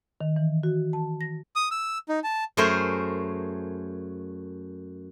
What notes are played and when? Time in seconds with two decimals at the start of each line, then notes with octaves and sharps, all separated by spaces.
0.21 D#3
0.36 E3
0.63 F#4
0.93 A5
1.21 A#6
1.56 D#6
1.71 E6
2.09 D#4
2.24 A5
2.57 F#2 A3 G#4 A#4 C5